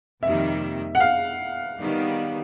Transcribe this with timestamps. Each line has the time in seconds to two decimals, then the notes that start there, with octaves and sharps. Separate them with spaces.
0.23 F2 C3 D#3 G3 A#3 E5
0.95 F#5
1.00 F5
1.80 D#3 G3 B3